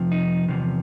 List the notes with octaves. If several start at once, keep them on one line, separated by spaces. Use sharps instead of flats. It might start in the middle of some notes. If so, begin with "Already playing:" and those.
Already playing: F2 C3 F3
D#4
E2 C3 F3